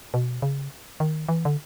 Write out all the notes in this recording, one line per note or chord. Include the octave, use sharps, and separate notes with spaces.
B2
C#3
D#3
E3
D3